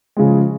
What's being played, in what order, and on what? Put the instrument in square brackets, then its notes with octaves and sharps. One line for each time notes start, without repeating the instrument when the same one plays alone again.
[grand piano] C#3 F3 G#3